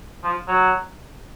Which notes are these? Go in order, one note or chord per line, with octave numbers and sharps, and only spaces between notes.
F3
F#3